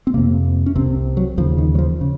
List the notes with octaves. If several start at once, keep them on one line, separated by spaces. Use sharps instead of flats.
C4
F2 C3 A#3
C#4
C2 C3 C4
F#3
D#2 C#3 F3
D#3
F#3
F3
C#3